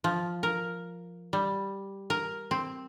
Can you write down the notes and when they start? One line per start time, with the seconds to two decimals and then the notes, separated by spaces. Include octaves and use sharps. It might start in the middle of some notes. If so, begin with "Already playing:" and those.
0.04 F3
0.43 A#4
1.33 G3
2.10 A#4
2.51 C4